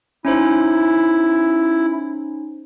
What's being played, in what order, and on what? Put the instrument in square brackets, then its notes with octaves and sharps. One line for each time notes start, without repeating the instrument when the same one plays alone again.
[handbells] C#4 D#4 C5 [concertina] E4